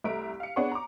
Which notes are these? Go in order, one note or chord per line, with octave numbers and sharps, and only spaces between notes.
C2 A3 E5 A#5 B6 D7
F5 C#7
B3 D4 G#4 C#5 F#5 C#6
A#5 D6